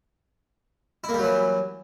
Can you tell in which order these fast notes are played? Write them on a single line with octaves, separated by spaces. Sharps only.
E4 A#3 G3 F#3 E3